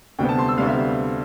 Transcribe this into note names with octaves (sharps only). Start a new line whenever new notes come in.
D2 C3 G3 B3 G5
A5
C6
E6
D2 C3 G3 B3 F5
E5